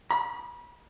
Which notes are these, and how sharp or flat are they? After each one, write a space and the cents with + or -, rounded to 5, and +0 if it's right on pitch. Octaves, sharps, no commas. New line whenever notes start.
B5 -35